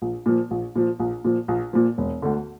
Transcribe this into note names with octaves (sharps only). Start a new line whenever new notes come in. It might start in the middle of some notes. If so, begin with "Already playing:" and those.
A#1
A#2 F3
A#1
A#2 F3
A#1
A#2 F3
A#1
A#2 F3
E1
D2 D3